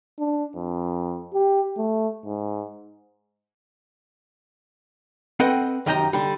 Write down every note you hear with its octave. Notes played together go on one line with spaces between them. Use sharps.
D4
F2
G4
A3
G#2
C4 A4 B4 D#5 F#5 G5
F#2 D#3 G4 D#5 G5 A#5
D3 G3